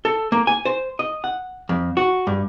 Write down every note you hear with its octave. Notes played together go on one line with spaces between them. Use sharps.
A4
A#3
G#5
C5
D#5
F#5
F2
F#4
G2